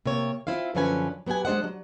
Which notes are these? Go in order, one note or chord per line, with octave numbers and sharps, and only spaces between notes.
C3 A#3 C#5
C4 E4 F4 F5
F#2 D3 F3 C#4 B4 G#5
F#3 B3 G4 F#5 G#5
G#3 D4 C5 D#5 F#5
F#3